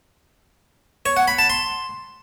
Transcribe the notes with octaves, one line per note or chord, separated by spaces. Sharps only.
C#5
F#5
B5
A5
C6